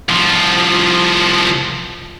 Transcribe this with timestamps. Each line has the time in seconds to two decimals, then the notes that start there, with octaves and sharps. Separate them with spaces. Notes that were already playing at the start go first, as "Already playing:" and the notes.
0.09 C2 F3